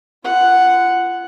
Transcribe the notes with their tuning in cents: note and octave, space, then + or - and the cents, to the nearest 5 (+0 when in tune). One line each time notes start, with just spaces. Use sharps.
F4 -30 F#5 +0